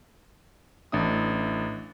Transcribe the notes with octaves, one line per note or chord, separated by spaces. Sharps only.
A1 D4 E5 D#6